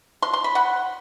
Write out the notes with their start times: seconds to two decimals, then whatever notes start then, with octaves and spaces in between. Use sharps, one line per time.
0.22 C6
0.33 C6
0.44 B5
0.55 F#5